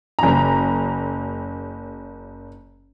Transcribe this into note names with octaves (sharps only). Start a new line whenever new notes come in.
F#1 A#5